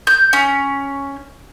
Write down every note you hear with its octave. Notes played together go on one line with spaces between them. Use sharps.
G6
C#4